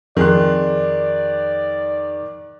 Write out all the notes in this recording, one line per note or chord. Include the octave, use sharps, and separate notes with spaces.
F2 D#3 G#4 D5 C6 F#6